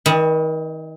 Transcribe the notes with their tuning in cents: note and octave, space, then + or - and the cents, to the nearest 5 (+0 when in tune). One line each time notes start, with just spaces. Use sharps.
D#3 +35 D#5 -30 B5 -15